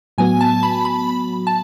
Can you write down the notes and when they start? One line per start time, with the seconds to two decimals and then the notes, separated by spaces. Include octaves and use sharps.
0.18 A2 F#3 B3 F#4 G#5
0.41 A5
0.63 B5
0.85 B5
1.47 A5